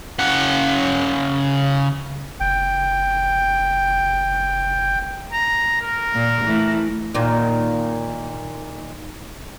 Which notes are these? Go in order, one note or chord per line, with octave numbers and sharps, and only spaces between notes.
C#3 F#5
F#1 G5
A#5
A#4
A#2
E3 A3 E4
A#2 D#3 A#3